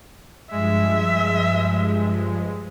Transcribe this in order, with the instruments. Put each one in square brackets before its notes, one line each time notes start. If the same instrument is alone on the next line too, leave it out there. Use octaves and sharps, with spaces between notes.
[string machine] G2 F3 [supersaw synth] G#3 [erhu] E5